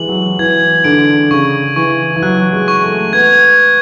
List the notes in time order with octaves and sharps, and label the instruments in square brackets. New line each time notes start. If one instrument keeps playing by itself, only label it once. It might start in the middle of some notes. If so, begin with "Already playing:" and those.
Already playing: [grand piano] E3 G#3 [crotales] F#7
[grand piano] F#3
[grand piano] E3 [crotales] G#6
[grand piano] D3 [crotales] D7
[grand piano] C#3 [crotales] C#6
[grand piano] E3 [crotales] C#6
[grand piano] E3
[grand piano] F#3 [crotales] F#6
[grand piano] G#3
[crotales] C#6
[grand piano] A3
[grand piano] B3 [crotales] G#6